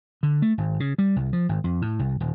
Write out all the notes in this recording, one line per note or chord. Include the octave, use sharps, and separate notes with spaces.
D3
A3
G#1
C#3
G3
C2
F3
G#1
F2
A2
C2
D#1